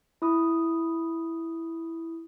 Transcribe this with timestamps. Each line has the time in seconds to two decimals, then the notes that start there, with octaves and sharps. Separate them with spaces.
0.22 E4 D#6